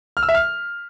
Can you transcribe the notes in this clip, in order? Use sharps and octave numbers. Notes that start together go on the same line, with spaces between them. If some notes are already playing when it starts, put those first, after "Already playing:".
F6
E6
E5
F6